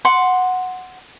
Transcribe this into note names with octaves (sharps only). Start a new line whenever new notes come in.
F#5 C6 D6